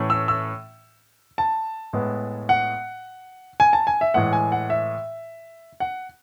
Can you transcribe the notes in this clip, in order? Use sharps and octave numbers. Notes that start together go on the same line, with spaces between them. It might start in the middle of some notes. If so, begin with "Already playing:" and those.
Already playing: A2 E3 A3 C#4
E6
E6
A5
A2 G#3 B3
F#5
G#5
A5
G#5
E5
A2 E3 G#3 F#5
G#5
F#5
E5
F#5